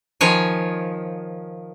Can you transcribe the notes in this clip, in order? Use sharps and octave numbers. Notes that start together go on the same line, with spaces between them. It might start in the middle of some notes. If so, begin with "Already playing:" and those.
D#3 F3 C#5 G#5